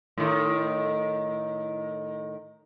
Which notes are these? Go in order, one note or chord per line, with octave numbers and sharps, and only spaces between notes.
A2 D#3